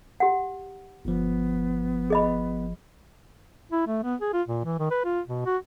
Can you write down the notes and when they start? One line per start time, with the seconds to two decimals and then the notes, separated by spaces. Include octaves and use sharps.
0.20 G4 F#5
1.05 G1 F3 B3
2.10 G#4 D#5 B5
3.72 E4
3.87 A3
4.03 B3
4.21 G#4
4.33 F4
4.48 A#2
4.65 E3
4.79 D#3
4.91 B4
5.05 F4
5.28 B2
5.46 F#4